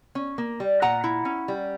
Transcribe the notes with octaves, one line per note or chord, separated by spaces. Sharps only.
C#4
A#3
G3
A#2 F#5 A#5
E4
C#4
G3